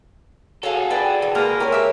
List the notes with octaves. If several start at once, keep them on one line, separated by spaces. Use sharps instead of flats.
F#4 G#4 A4 C#5 E5 F5
B4 D5 G5 G#5
E3
G#3 A#3 B4
G4 A#4 C#5 G#5
G#3 G4 E5